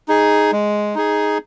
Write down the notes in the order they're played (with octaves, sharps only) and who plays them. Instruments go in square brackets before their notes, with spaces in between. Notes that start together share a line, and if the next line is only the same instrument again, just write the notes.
[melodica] D#4 G#4
G#3
D#4 G#4